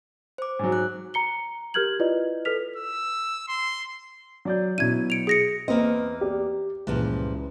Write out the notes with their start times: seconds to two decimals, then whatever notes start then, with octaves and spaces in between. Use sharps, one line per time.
0.38 C5 D6
0.59 G#2 F#3
0.72 F#6
1.14 A#5 C#7 G7
1.74 G4 A#4 F6 G6 G#6 F#7
2.00 E4 F4 B4 D5 D#5
2.45 A4 B4 F6 B6 F7
2.76 E6
3.48 C6
4.45 F#3 D5 G6
4.78 B2 F#3 E4 G#6 D#7
5.10 C#7 D7 F7
5.27 G#4 A#6 C#7
5.68 E2 A#3 C4 B4 D#5
6.21 G4 D5
6.87 C#2 G2 A#2 E3 F3